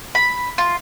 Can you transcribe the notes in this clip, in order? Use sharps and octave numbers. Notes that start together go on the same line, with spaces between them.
B5
F4